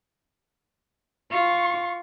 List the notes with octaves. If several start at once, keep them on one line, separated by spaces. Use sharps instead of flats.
F4 C#6